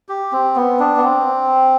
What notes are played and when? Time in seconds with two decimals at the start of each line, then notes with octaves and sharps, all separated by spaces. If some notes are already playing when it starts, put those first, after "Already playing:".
0.09 G4
0.32 C4
0.56 B3
0.80 D4
0.97 B3
1.04 C4